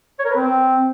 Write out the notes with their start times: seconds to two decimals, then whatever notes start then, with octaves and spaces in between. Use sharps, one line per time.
0.19 C#5
0.25 A#4
0.30 B4
0.36 C4